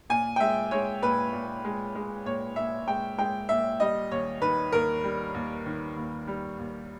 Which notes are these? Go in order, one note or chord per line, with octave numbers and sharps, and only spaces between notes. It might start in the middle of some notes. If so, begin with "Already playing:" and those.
A#2 G#5
G5
G#3 E5
G#3 C#5
A#2 B4
A#2
G#3
G#3
A#2 C#5
A#2 E5
G#3 G5
G#3 G5
A#2 E5
G3 D#5
D#2 C#5
D#3 B4
D#2 A#4
G3
D#2
D#3
D#2
G3
D#2